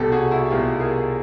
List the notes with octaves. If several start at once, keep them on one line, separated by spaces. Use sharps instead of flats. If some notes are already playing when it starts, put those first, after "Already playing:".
Already playing: C2 B2 G4 A4
F#4 G#4
E4 F#4
C2 B2 F4 G4
G#4 A#4